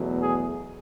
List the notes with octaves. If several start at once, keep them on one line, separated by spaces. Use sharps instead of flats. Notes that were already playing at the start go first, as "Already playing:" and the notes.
Already playing: E2 B2 F#3 A3
G#4